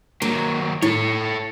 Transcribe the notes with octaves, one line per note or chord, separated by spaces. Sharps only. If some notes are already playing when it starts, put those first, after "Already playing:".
D#3 F#3 A#3
A2 E4 A4 C#5